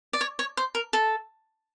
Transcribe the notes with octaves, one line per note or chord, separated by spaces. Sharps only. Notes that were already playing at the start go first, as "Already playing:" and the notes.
D5
C#5
C#5
C5
A#4
A4